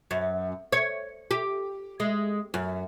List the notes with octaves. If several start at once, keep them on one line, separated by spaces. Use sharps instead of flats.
F#2
C#5
G4
G#3
F#2